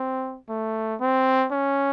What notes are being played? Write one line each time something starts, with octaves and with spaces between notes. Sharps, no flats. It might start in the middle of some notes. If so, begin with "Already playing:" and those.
Already playing: C4
A3
C4
C#4